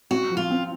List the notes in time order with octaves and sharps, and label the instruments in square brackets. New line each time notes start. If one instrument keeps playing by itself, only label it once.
[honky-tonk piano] C4 [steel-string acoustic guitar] F#4
[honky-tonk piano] F3
[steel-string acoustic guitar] F4
[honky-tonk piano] C4